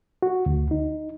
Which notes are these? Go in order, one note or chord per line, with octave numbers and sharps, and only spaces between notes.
F#4
D2
D#4